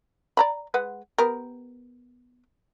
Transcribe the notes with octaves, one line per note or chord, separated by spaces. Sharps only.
D5 A#5 B5
G#3 B4 F#5
B3 G4 A#4